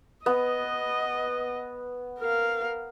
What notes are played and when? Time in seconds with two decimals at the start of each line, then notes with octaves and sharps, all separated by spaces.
0.26 B3 D#5
2.20 A#4 F5